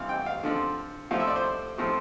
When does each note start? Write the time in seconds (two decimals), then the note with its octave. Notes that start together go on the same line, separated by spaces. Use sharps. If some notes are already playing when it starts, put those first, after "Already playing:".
Already playing: C3 E3 G3 C4 F5
0.09 G5
0.26 F5
0.43 D3 F3 C4
1.11 A2 F3 C4 F5
1.20 E5
1.27 D5
1.36 C5
1.78 A2 F3 C4